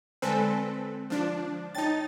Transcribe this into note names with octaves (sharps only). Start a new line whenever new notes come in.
D3 G#3 C4 A4 B4 G#5
F3 D4
D#4 C#5 G5 A5 A6